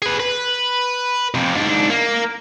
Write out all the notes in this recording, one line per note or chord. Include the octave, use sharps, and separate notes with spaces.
G#4 B4
B4
F2 C3
G#2 D4
A#3